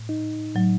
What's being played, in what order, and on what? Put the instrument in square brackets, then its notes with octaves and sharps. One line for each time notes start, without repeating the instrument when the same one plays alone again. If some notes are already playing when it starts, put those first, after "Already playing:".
Already playing: [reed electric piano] A2
D#4
[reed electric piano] A2 [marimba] F#3